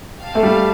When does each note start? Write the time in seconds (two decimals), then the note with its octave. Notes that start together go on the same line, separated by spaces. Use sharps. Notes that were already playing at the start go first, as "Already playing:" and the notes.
0.19 G4 F5 A5
0.35 A3
0.43 G3